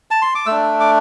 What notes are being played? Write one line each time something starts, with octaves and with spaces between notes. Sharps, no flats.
A5
C6
D6
A3 D4 E6
D6